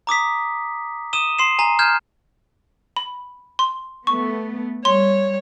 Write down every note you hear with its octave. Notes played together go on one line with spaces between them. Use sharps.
A#5 D6 D#6 B6
D#6 D#7 E7 G7
C6 C7 E7
G#5 A#5
F6 G6 G#6 E7
B5
C6
A3 B3 C#6
G3 C#5 C6